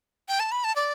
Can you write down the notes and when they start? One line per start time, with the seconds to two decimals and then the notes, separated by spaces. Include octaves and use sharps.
0.28 G5
0.40 A5
0.52 B5
0.64 A5
0.76 D5